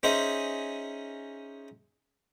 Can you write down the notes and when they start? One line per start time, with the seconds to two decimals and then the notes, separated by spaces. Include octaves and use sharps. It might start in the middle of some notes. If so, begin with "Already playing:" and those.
0.03 C#4 D#4 G#4 C5 D#5 E5